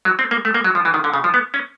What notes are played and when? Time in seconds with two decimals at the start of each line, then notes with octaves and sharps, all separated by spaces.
0.05 F#3
0.19 C4
0.31 A#3
0.45 A3
0.54 A#3
0.64 F#3
0.75 F3
0.85 E3
0.94 D#3
1.04 D3
1.14 C#3
1.24 F3
1.34 B3
1.54 C#4